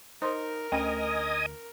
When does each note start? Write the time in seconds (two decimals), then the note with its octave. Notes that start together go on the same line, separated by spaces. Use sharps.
0.22 D#4 A#4 C5 C6
0.72 D2 C#4 D#5 G5 G#5 D#6